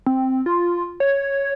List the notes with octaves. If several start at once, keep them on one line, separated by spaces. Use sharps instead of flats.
C4
F4
C#5